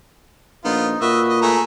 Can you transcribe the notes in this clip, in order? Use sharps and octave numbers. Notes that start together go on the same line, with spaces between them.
A#1 B3 D#4 F4
A#2 F#4 B4 D#5 E5
D#5
A3 G#4 A#5